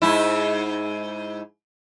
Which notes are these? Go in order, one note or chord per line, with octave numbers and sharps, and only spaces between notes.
G#2 E4